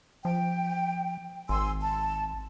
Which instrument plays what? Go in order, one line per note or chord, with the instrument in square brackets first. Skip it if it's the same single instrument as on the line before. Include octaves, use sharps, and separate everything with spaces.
[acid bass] F3 [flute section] G5
[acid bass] G#1 [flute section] G#5 C6 E6
[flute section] A5